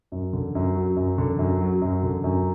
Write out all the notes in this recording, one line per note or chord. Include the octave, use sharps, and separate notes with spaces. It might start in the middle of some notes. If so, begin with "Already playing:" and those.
F#2
D3
F#2
F#3
F#2
D3
F#2
F#3
F#2
D3
F#2